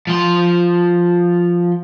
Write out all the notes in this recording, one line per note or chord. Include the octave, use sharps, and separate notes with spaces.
F3 C6